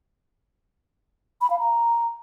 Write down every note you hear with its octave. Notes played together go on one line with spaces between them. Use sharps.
B5
F5
A#5